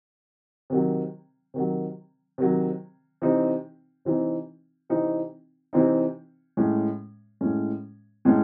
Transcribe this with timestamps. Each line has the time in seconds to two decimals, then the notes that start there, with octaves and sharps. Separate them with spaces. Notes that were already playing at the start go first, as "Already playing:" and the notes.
0.70 C3 D#3 F#3
1.54 C3 D#3 F#3
2.38 C3 D#3 F#3
3.22 C3 E3 C4 D#4
4.05 C3 E3 C4 D#4
4.90 C3 E3 C4 D#4
5.73 C3 E3 C4 D#4
6.57 A2 G#3 C#4
7.41 A2 G#3 C#4
8.25 A2 G#3 C#4